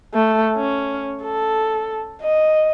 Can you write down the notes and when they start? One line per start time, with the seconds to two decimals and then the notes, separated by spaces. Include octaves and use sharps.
0.14 A3
0.56 C#4
1.24 A4
2.22 D#5